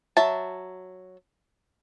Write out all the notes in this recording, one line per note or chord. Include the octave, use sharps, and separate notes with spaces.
F#3 E5 A5